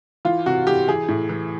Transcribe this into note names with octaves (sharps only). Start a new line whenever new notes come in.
E3 F4
C3 F#4
E3 G4
E3 G#4
A2
E3